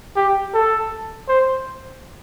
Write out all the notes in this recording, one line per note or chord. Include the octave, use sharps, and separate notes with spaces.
G4
A4
C5